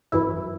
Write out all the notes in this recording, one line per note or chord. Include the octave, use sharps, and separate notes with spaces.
G#1 F#2 E3 E4